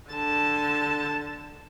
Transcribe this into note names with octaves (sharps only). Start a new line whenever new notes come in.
D3 A5